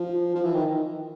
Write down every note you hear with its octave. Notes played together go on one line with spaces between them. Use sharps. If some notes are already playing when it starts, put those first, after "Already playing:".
Already playing: F3
F3
E3
D#3